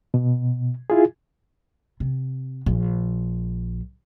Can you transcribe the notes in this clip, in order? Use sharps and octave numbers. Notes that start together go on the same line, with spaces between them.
B2
E4 F4 G#4
C3
A#1